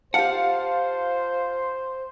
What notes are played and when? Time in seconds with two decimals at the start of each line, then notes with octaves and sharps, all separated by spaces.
0.14 F4 G4 C5 F5 F#5 A5